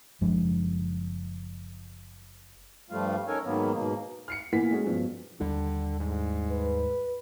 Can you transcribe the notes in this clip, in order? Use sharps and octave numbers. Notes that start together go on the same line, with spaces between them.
F#1 F3 G#3 D4
G2 F3 G3 A3 F4 F5
C#4 D#4 A4 A#4 C#5 G#5
G#2 D#3 F#3 A#3 B3
G#2 B2 A#3
F6 C7 C#7
A#2 E3 A#3 B3 F#5 B6
G#3 A3 C#4 F#4 G#4
G2 B2 F3
D#2 D3 G3 D4
G#2
B4